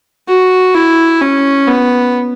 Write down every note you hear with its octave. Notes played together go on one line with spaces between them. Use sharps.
F#4
E4
C#4
B3